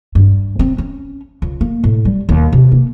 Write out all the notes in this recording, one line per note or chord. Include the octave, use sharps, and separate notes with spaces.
G2
C4
C#4
C#2
A#3
A2
G3
D#2
C3
A#3